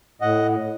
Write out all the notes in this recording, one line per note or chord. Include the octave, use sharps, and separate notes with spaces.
A2 D#5 F#5